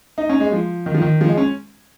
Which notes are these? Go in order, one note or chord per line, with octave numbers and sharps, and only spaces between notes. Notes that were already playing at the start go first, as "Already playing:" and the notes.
D#4
C#4
G#3
F3
D#3
F3
D#3
F3
G#3
C#4